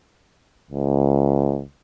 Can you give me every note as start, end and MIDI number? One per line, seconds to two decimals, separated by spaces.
0.71 1.62 37